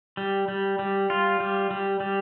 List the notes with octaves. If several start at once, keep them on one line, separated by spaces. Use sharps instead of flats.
G3
G3
G3
F4
G3
G3
G3